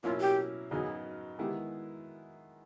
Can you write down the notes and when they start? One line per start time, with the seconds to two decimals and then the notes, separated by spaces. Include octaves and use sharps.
0.03 B2 F#3 A#3 C#4 E4 F4
0.20 G4
0.70 F#2 C#3 F#3 B3 D#4 G#4
1.38 D#3 G#3 B3 E4 G4